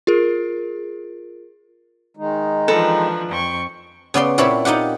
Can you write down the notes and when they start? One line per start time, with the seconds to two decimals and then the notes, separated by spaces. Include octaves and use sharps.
0.07 F4 G#4 A#4
2.17 D#3 G#3 D#4
2.68 E3 F3 D4 A4 B4 A#5
3.29 F2 G5 C#6
4.14 C#3 B3 D5 C6
4.38 A#2 C4 E4 C#5 A5 B5
4.65 D#4 F4 G4 F#5